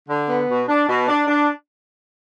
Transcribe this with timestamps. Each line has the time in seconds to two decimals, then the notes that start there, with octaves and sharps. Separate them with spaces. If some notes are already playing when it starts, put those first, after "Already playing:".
0.08 D3
0.28 B3
0.48 B2
0.67 D4
0.87 B2
1.08 D4
1.27 D4